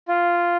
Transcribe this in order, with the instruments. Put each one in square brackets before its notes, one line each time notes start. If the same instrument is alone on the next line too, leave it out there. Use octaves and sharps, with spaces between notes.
[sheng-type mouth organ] F4